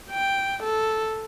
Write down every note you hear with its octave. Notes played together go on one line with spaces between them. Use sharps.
G5
A4